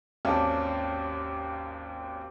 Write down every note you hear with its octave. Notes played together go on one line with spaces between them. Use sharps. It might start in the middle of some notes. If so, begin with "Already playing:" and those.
G#1 D#2 C#4 D4